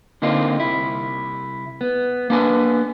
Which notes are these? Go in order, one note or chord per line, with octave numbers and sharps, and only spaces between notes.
D3 A#3 C4 D#4 F4
C2 E4
B3
A#3 B3 D4 B4 F#5 G#5